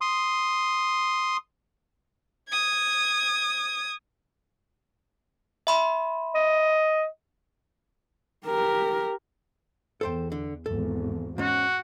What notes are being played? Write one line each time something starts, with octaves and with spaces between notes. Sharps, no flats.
C6 D#6
D#6 G#6
E5 B5 C6
D#5
G4 A#4
E2 A4 C5 G5
D3
G#1 E2 A4
G#2 C#4 F#4